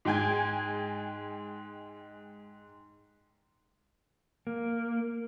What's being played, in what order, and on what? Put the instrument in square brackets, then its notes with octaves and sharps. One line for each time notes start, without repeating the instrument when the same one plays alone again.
[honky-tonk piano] G#2 G#3 G5 G#5 G#6
[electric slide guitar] A#3